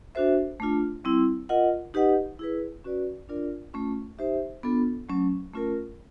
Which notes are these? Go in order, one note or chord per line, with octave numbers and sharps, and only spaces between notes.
D4 F#4 A4 C5 E5
A3 D4 F4
G3 C4 E4
F4 A#4 D#5 F#5
D#4 G4 B4 D#5 F#5
E4 G#4 B4
C#4 F#4 B4 D5
D4 F4 A#4 D5
A3 C#4 F4
D#4 G4 C5 E5
B3 D4 F4 A4
F#3 A3 C#4
A3 C#4 F4 A#4